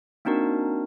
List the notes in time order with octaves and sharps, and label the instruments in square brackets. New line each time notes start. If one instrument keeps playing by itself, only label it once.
[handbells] A#3 C4 D4 D#4 F#4 A#4